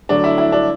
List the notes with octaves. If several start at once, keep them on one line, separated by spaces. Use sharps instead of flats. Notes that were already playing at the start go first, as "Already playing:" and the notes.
D3 F#3 A3 D4
E4
E4
D4